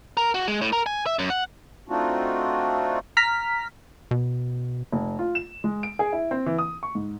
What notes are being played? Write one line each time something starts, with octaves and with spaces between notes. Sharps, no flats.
A#4
F#4
G#3
A2
A#4
G#5
E5
F#2
F#5
A3 C4 D4 D#4 F4 F#4
A#5 F6 B6
B2
F1
F4
E7
G#3
D7
G#4
E4
C4
E3
D#6
C#6
G#2